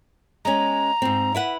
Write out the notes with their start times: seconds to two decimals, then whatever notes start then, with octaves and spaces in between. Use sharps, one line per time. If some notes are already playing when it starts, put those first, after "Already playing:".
0.45 G#3 C#4 A#5
1.02 G#2 C4
1.35 E4 B4 F#5